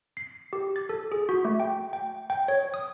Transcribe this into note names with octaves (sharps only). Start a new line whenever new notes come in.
C7
G4
A6
A4
G#4
F#4
A3
G5
G5
G5
C#5
D#6